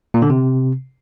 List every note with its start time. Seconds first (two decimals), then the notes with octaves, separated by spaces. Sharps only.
0.14 A#2
0.22 D3
0.30 C3